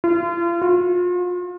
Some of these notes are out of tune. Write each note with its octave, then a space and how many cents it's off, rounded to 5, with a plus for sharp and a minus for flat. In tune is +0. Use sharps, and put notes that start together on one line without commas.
F4 -40
F4 +40